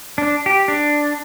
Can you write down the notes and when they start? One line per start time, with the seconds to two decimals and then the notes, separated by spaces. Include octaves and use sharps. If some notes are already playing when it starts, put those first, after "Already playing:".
0.18 D4
0.46 G4
0.68 D4